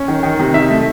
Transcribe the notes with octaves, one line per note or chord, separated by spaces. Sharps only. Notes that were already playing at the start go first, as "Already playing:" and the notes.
Already playing: C#4
D#3
D#3
C3
D#4 E5
A3